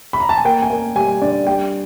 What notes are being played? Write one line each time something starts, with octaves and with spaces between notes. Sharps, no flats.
B5
A#5
A5
G#5
A#3 G5
G#5
A#3
G3 G#5
D3 D5
G3 G5